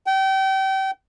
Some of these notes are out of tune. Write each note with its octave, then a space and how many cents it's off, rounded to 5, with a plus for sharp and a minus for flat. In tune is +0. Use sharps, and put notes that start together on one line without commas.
G5 -30